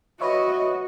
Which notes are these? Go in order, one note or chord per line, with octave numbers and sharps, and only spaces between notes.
F#4 B4 C#5 D#5 E5